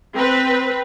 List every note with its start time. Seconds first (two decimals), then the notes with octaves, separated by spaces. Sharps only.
0.15 C4 B4